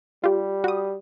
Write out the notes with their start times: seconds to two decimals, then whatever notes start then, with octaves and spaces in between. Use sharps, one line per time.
0.24 G3 F4 G4
0.64 F#4 D#6